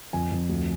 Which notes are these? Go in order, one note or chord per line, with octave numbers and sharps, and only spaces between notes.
F2 G#5
F2
D2